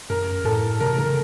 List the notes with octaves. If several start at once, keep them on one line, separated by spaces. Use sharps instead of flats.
F#2 A#4
A2 A4
C3 A#4
C#3 A#4